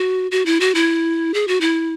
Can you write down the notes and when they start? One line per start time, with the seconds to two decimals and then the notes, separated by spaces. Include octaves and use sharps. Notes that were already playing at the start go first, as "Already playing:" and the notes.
Already playing: F#4
0.31 F#4
0.46 E4
0.60 F#4
0.75 E4
1.34 G#4
1.48 F#4
1.61 E4